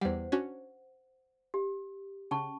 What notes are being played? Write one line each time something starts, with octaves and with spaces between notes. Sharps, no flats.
E2 G3 C5 F#5
C#4 D4 F#4
G4
C#3 C#4 A5 C#6